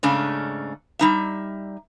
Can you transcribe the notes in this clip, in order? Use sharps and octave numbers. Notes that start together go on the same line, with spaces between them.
G#2 C#3 A3 C#4 D4
G3 D#4 E5